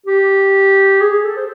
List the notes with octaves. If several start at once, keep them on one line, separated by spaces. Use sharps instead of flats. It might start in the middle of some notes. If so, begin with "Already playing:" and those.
G4
G#4
G#4
A4
C5